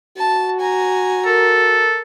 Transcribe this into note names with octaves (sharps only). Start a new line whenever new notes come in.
F#4 A5
G#5 A#5
A4 A#4